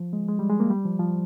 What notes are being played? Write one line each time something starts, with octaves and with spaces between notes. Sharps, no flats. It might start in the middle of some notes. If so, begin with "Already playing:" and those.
Already playing: F3
G#3
G#3
G3
G#3
A#3
G3
F3
F3